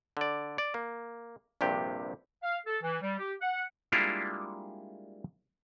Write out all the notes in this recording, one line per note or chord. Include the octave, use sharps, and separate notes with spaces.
D3 D5
D5
A#3
A#1 G2 C3 G4
F5
A4
E3
G3
G4
F#5
G3 G#3 A#3 D4 E4 F4